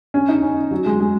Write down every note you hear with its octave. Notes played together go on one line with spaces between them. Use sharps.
C#4
D#4
C#4
F#3
G#3
G#3